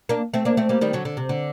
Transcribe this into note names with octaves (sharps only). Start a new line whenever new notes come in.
A#3 D4
A3 C4
A#3 D4
A3 C4
G3 A#3
D#3 G3
D3 F#3
D3
C3
D3